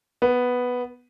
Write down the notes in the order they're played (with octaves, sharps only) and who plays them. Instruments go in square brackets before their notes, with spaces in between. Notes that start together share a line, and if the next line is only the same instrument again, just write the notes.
[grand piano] B3